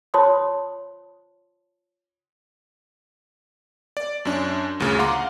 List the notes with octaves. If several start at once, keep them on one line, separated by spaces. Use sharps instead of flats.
F4 C5 C#5 A5 C6 D#6
D5
F#2 C#4 D4
G1 D2 A#2 C#3
F5 F#5 A#5 C6 D6